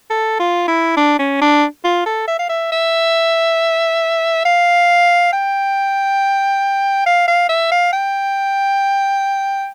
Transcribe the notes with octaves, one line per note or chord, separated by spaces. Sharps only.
A4
F4
E4
D4
C#4
D4
F4
A4
E5
F5
E5
E5
F5
G5
F5
F5
E5
F5
G5